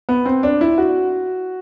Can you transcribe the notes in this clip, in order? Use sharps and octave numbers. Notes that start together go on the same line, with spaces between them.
B3
C4
D4
E4
F#4